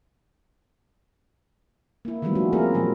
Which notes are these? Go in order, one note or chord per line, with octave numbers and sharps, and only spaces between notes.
A#3 E4
D#3 E3 F#3 G3 A3 B3
F3 C#4 F4 F#4
A#3 C4 E4 F4 G#4 A#4
A#2 E3 F#3 G#3 A#3